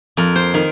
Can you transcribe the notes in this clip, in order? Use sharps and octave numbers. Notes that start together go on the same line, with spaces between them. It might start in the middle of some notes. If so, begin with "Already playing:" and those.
F2 A#4
C5
D#3 A#4